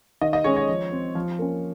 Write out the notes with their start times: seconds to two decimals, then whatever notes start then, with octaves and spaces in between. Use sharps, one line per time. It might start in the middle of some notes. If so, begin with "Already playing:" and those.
0.21 D#3 D#5
0.33 D#5
0.44 G#3 C#4 C#5
0.56 C#5
0.69 F3
0.92 C4
1.15 F3
1.39 A#3 C#4